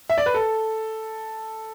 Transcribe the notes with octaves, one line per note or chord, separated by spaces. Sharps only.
E5
D5
B4
A4